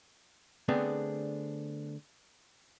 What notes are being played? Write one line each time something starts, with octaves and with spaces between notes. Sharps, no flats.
D3 A3 B3 C4 D4 G#4